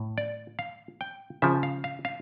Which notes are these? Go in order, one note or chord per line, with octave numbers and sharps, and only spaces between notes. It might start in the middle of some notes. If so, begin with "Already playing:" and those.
Already playing: A2
D5
F5
G5
C#3 F3 E5
F5
F5
F5